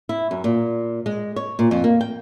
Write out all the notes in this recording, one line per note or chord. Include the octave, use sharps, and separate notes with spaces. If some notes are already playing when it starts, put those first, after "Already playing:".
E4
F#2
A#2
G#3
C#5
A#2
F2
A#3
G5